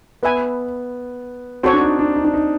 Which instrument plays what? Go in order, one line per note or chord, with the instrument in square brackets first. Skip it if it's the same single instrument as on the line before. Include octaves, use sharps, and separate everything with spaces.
[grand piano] B3 [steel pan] B4 E5 G#5
[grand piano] C4 [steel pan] F#4 A4 C#5
[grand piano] D4
D#4
D4
D#4
D4
D#4